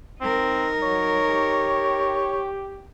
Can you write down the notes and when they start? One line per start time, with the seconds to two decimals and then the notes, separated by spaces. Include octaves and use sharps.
0.21 C4 D#4 A#4
0.83 F#3 C#5
1.30 G4